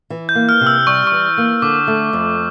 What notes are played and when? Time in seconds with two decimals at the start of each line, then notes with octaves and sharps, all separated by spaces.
0.10 E3
0.29 G6
0.35 A#3
0.49 F6
0.61 C3
0.67 E6
0.87 G3 C#6
1.07 E3 C#6
1.38 A#3
1.62 D3 D6
1.88 A3
2.13 F2